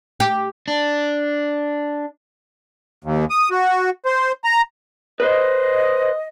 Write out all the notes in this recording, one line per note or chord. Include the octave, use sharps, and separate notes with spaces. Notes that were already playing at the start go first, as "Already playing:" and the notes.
G4
D4
D#2
D#6
F#4
C5
A#5
B4 C5 D#5